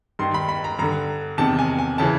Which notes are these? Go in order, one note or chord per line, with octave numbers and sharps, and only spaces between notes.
G2 D#3 C6
B5
B5
A#5
G2 D3 A#5
E2 C3 D#3 A5
G#5
G#5
C#3 E3 A5